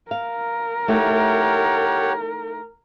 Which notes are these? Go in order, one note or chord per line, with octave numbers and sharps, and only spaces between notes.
A#4 F5
A3 D#4 E4 G4 C#5 F#5